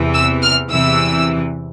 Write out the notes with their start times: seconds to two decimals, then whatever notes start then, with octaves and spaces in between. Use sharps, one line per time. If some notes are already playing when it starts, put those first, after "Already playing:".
Already playing: E2 C3 E3
0.14 E6
0.42 F6
0.71 E2 C3 E3 E6